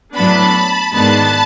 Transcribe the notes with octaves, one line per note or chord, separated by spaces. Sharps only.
A2 F#3 B3 D4 A5 B5
G#2 D#3 G#3 B3 D4 A5 B5